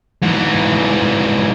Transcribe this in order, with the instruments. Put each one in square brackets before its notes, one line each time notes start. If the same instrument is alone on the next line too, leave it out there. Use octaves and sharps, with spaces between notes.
[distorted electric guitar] G#2 E3